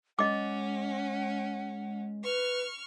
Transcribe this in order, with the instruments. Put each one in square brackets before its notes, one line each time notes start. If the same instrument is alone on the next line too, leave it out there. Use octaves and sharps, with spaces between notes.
[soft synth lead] G#3 [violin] C#4 [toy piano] D#5 D6 [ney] F#5
[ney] B4 [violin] C#6 F6